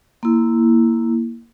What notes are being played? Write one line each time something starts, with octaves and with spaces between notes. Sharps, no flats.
A#3 E4